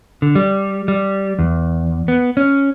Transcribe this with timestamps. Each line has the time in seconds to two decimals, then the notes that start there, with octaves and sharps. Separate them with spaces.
0.22 D3
0.35 G3
0.88 G3
1.39 E2
2.08 B3
2.37 C#4